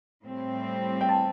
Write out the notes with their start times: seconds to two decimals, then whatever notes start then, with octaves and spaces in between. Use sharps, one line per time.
0.23 A2 G3 C4
1.01 G5
1.09 A5